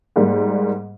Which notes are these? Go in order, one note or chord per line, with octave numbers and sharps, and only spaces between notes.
G#2 G3 A#3